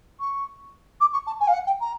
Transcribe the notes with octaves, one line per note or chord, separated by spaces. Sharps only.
C#6
D6
C#6
A5
G#5
F5
F#5
G5
A#5